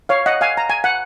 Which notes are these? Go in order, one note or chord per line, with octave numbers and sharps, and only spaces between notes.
C#5 F5
D#5 F#5
F5 G#5
A#5
G#5
F#5